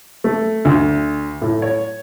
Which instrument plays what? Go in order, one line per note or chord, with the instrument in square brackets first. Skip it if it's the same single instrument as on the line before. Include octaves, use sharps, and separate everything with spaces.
[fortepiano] A3
D2
A2
C#5